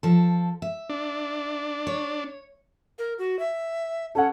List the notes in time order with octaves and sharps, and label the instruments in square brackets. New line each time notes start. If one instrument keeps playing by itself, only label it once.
[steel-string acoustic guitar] F3 A4
E5
[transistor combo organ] D4
[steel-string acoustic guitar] C#5
[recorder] A#4
F#4
E5
[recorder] C#4 [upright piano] A4 F#5